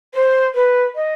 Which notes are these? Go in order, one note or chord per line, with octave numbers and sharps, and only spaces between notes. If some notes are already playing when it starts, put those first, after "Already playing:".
C5
B4
D#5